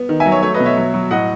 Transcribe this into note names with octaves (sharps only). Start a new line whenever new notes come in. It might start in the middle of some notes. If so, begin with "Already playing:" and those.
Already playing: B3
D#3
E5 G#5
F#3
C#5
A3 C#5
B4 D#5
B2
C#5 E5
F#3
F#3
A2 D#5 F#5